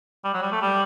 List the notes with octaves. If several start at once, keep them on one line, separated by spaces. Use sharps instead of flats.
G3
F#3
G3
A3
G3